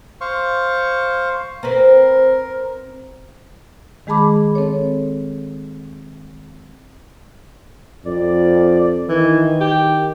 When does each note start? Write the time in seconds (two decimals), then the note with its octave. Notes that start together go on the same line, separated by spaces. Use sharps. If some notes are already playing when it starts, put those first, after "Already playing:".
0.21 C5 F5 C#6
1.63 C4 A#4 B4
4.07 D#3 G#3 G#4 A5 B5 D6
4.55 C4 A4 C#5
8.06 F2 D5
9.09 D#3 E3
9.61 G4